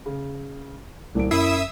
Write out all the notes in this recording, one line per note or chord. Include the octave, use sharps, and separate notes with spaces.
C#3
D#1 C2 D7
F#2 E4 E5 D#6 E6 C7